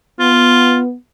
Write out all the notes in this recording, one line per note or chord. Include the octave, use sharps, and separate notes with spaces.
B3 F4